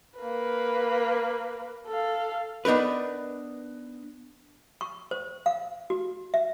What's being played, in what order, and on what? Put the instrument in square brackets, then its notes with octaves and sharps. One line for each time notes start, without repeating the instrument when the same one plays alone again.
[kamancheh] A#3 B4
A4 F5
[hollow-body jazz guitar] B3 D4 D#4 A#4 B4
[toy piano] C#6
C5
F5
F#4
E5